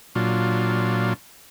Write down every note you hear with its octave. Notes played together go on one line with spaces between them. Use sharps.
A#2 F#3 D4 F4